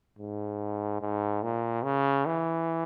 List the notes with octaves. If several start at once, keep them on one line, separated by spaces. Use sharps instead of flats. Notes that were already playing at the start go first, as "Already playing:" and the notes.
G#2
G#2
A#2
C#3
E3